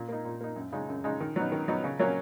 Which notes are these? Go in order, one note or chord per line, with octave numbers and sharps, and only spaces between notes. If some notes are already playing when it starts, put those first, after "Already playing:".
Already playing: A#2
A#3 D#4
A#2
A#3 D#4
F#2
C#3 G#3 D#4
F#2
C#3 G#3 D#4
D#3
F#3 B3 D#4
D#3
F#3 B3 D#4
C#3
F#3 A#3 C#4